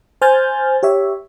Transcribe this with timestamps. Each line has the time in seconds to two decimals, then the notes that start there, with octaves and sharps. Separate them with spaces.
0.22 C5 G#5 F6 G6 A6
0.83 G4 C#5 E5